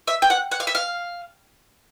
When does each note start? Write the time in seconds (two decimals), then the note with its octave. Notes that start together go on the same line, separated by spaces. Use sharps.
0.07 E5
0.22 G5
0.30 F#5
0.52 F#5
0.60 F5
0.67 E5
0.75 F5